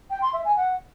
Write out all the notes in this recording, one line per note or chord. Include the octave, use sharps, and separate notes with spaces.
G5
C6
E5
G#5
F#5